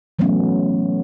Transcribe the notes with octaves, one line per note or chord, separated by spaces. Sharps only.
E3 F#3 A3 B3 C#4